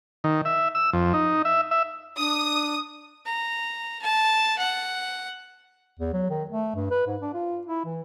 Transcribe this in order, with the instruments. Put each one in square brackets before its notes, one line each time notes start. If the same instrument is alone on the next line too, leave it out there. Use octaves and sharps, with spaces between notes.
[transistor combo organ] D#3
E5
E6
F2
D#4
E5
E5
[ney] D4 [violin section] D#6
[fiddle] A#5
A5
F#5
[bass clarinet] E2
F#3
D#3
A3
G2
B4
G#2
D4
F4
E4
E3